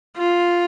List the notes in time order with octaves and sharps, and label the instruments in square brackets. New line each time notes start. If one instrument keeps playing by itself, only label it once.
[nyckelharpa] F4